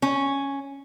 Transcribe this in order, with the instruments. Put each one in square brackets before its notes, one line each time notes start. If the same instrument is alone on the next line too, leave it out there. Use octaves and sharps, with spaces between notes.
[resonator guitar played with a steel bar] C#4